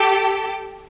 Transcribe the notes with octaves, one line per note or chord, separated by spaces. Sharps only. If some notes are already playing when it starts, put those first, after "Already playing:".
Already playing: G4 A4